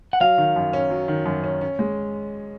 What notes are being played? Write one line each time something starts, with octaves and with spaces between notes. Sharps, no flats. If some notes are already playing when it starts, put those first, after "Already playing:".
F#5
F#3 F5
D#3
F#2
C#4
F#3
D#3
F#2
C#4
C#4
G#3